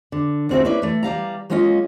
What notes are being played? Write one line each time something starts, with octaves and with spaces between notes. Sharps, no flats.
D3
D2 A2 C4 F#4 G#4 E5
A#3 C#4 E4 B4 D5
E3 A3
E3 G3 F5 A#5
F#3 G#3 A#3 C#4 F4 D#5